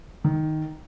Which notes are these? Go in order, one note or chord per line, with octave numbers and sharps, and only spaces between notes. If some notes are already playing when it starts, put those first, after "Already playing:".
D#3